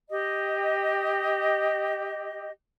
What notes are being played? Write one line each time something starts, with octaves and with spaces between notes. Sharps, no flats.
G4 D#5